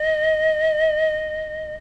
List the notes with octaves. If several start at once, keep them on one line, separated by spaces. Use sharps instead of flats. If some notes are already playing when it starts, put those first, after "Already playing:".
Already playing: D#5